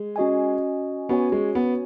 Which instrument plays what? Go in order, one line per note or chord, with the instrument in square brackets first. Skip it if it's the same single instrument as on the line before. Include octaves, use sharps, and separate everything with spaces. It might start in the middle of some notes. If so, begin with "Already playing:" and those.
Already playing: [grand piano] G#3
[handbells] C#4 F#4 D#5 G#5
[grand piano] B3 [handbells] C#4 F#4 C#5 G#5
[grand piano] G#3
B3